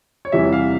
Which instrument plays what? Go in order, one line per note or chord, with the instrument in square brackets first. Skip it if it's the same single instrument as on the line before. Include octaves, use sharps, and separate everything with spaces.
[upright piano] C#5
E2 C3 E3 G3 E5
F5